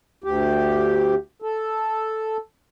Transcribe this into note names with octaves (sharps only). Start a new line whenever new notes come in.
D2 G4
A4